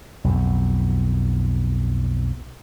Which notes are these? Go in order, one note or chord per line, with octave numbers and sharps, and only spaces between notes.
B1 F2